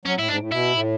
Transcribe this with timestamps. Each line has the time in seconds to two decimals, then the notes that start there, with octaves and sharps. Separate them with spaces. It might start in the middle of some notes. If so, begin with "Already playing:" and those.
0.05 F#3 C#4
0.17 A2 E4
0.28 G#2 D4
0.40 A2
0.52 B2 E4
0.74 A2